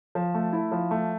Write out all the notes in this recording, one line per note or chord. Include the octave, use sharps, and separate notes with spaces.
F3
A3
E4
F3
A3